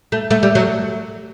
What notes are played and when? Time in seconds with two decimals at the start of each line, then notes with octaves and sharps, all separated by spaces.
0.12 A3
0.30 A3
0.43 G3
0.55 F#3